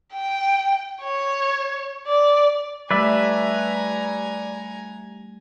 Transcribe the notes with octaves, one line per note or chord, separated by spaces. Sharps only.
G5
C#5
D5
G3 A3 B4 D5 E5 G#5 A#5